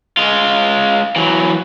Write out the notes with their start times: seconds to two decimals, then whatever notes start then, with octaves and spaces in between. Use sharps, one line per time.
0.17 G#3 F4
1.16 E3 F#3